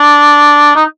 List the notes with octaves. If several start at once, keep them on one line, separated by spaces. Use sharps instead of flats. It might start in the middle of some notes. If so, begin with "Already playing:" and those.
Already playing: D4
D#4